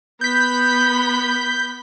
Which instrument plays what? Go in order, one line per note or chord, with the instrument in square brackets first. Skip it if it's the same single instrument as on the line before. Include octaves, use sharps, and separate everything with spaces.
[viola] B3 B5 [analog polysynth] G6 B6